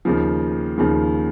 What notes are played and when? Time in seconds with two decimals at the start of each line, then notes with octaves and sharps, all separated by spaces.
0.05 D#2 C#3 F3
0.78 D#2 C#3 F3